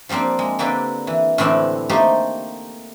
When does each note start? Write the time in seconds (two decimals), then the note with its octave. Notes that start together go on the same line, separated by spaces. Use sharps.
0.09 F3 G3 A#3 C4 D4
0.39 G#3
0.59 D3 A#3 C4 G4 B4 D5
1.07 E3
1.38 A2 D3 E3 C4 E4 G4
1.89 A3 A#3 D#4 G4 C5